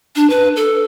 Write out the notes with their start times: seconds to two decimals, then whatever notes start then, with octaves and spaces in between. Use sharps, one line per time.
0.16 D4
0.30 B4
0.56 A4